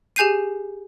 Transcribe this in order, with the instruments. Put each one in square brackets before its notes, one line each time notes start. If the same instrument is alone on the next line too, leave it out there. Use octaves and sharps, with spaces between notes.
[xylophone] G4 G#4 G#5 G6 C7 D#7